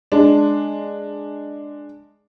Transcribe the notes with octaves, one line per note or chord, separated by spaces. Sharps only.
G#3 D4